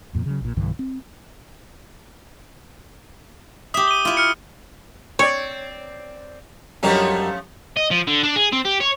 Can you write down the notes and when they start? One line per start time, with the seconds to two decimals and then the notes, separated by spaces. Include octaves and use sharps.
0.13 D#1 F2 A#2
0.26 C#3 F#3
0.41 A#1 A#2
0.56 B1 G2 D3 E3
0.79 C4
3.74 G4 E5 D#6
3.88 D#7 G7
4.05 E4 F4
4.17 F6 C#7
5.19 C4 C#5 D5
6.83 F#2 F3 G3 A3 C#4 D#4
7.77 D#5
7.91 F3
8.07 D3
8.23 D4
8.36 G#4
8.52 C4
8.65 G4
8.80 C#5